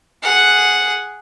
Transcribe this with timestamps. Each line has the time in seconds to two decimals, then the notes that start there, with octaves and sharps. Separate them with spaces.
0.23 G#4 F#5